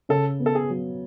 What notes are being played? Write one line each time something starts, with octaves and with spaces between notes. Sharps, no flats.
C#3 A4
B3
A4
G#4
F#3